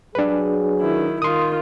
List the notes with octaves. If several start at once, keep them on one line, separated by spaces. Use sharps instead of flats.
F#3 D4 G#4 B4
D#3 E4
D#3 F4 C6 D#6